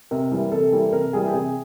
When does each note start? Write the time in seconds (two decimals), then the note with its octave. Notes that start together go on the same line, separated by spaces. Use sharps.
0.11 C3 A#4
0.31 E3 G3 A#3
0.52 C3 A4
0.72 E3 G3 A#3
0.92 C3 A#4
1.13 E3 G3 A#3 G#4
1.28 G4
1.33 C3 G#4